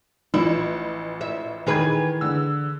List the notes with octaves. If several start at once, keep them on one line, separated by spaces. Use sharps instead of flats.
A1 E3 F3 E4
E5
D#3 E3 G#4 B4 G#6
D3 E6